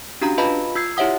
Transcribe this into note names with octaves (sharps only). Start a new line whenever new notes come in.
C#4 D4 F#4 G4 F5 A#5
F4 B4 D#5 F5 A5 B5
F4 E6 G#6 C7
E4 G4 C#5 E5 F#5 D#6